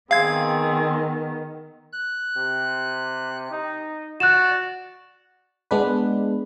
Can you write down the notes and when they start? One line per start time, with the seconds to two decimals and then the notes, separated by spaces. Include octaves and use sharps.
0.11 D#3 B3 C4 G#4 F5 G#6
1.93 F#6
2.37 C3
3.51 D#4
4.20 F#4 D5 F#6 E7
5.71 G#3 B3 D4 B4